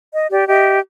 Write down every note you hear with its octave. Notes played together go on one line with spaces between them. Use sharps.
D#5
G4 D5
G4 D#5 E5